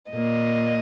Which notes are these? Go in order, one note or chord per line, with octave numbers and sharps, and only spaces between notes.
A#2 A#3 D#5